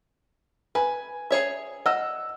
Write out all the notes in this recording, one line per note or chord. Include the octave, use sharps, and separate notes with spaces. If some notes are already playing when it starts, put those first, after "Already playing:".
B4 G#5
G#4 C#5 E5
D#5 F#5 E6